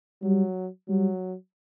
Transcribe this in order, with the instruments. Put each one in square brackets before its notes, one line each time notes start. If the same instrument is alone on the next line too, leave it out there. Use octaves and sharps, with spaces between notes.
[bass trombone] F#3 [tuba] G3
[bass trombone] F#3 [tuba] G3